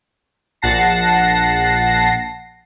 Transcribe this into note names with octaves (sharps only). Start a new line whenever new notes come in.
A#1 F#5 A5 A#6 C7